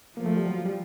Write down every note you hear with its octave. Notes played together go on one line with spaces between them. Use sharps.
F3 A#3
A3
G3
F#3
G3